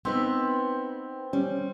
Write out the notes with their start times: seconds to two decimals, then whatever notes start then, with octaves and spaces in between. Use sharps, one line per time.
0.05 B3 C4 D#4 B4
1.33 G3 C#4